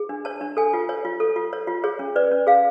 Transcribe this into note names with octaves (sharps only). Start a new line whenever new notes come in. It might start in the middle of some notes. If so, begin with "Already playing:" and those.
Already playing: G#4
D4
C#5 A5
D4
A4 G#5
F4
C#5
F4
A4
F4
C#5
F4
G#4 C#5
C#4
B4 D5
C#4
G#4 F5